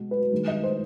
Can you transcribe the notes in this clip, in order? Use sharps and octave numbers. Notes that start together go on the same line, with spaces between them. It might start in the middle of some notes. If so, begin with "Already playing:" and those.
Already playing: B2 G#3
B4
G2 D#3 G#3
D#5
C5